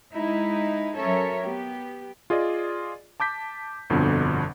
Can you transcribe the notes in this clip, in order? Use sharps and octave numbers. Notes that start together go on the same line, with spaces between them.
G#3 D#4 E4
F#3 C#4 A4 A#4 C#5 E5
B3 G4
F4 G#4 D5 D#5
A5 D6 G6 B6
G1 F2 B2 D3